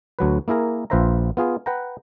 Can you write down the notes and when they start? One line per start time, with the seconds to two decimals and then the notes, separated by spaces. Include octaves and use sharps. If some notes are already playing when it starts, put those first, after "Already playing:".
0.19 D2 F#3 B4
0.48 A#3 E4 G#4 A#4
0.90 A#1 F4 B4 C5 E5 A#5
1.37 B3 F4 G#4
1.66 B4 F#5 G5 A#5